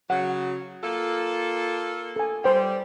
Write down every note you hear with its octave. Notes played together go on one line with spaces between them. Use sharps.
C#3 F#3 F#5
A#3 F4 A4
A4 G#5
G3 C5 G5